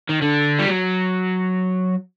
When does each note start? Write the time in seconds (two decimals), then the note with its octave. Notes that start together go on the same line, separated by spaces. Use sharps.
0.09 D#3
0.22 D3
0.59 G3
0.68 F#3